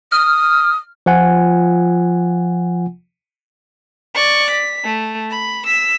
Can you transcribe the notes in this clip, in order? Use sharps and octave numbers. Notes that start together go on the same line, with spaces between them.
D#6 F6
F3 F4 F#5 G#5
D5 C#6
B6
A3
B5
E6 B6